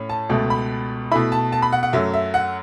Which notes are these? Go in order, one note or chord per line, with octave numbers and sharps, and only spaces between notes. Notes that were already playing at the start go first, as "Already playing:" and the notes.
Already playing: A2 C#4
A5
C#2 B2 A3
B5
B2 A3 E4 B5
A5
A5
B5
F#5
F#5
F#2 F#3 A3 E5
E5
F#5